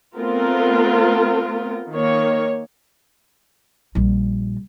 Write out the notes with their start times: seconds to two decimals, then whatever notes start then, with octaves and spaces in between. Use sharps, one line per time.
0.17 A3 B3 C4 F4 A#4
1.92 D#3 A#3 C#5
3.95 A#1 G3